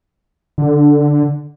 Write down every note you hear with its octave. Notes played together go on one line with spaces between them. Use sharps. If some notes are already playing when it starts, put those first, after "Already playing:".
D3